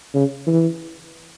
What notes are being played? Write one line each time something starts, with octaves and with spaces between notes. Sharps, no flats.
C#3
E3